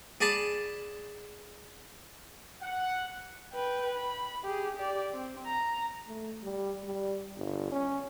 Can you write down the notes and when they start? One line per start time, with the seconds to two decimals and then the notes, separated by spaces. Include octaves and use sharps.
0.21 G#4 D5 G#5 A5 B5
2.62 F#5
3.54 B4 G5
3.95 B5
4.44 G4 G#4
4.76 G4 D5
5.14 C4
5.47 A#5
6.07 A3
6.43 G3
6.84 G3
7.37 G1
7.71 C#4